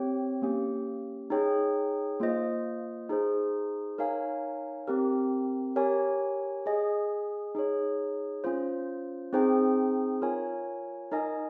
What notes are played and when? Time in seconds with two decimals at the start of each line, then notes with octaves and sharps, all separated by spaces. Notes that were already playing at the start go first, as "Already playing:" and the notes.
Already playing: C4 G4 C#5 G5
0.42 A#3 C#4 G4
1.30 D#4 G#4 C#5 G5
2.20 A#3 F4 C5 D#5
3.09 D#4 G#4 C5
3.98 D#4 A#4 C#5 F5 G#5
4.87 C4 G4 A#4
5.76 G4 A#4 C#5 G#5
6.66 G#4 D#5 G#5
7.55 D#4 G#4 C#5
8.44 C#4 F4 C5
9.33 C4 D#4 G#4 C5 G5
10.22 F4 A#4 C#5 G#5
11.11 D#4 A#4 D#5 G#5